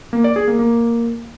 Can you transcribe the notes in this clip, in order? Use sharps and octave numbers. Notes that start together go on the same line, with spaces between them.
A#3
D5
G#4
A#3
A#3